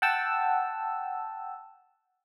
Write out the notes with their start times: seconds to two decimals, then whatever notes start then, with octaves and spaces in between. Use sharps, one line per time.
0.02 F#5 G5 A5 E6